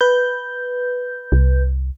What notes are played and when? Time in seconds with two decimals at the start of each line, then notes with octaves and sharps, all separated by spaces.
0.01 B4 G6
1.32 C2